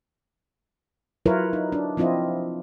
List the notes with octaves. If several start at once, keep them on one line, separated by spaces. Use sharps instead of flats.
F#3 E4 F4 A#4 B4 C#5
D#4
D4
F3 C4 E4 F4 D#5